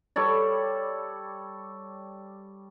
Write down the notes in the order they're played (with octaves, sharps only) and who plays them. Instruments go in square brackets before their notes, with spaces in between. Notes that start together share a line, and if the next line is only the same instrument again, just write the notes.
[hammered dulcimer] G3 A4 C#5 D5